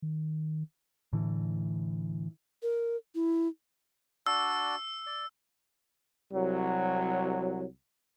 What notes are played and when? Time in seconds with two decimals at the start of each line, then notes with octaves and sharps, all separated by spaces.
0.02 D#3
1.13 A2 D3 E3
2.63 A#4
3.15 E4
4.26 D4 F#4 D5 E6
5.07 D5
6.33 C2 F#3